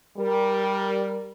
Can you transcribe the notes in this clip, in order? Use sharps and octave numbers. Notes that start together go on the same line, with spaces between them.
G3 A#4